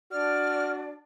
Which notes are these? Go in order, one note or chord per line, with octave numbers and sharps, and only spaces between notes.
D4 F#4 D5 F6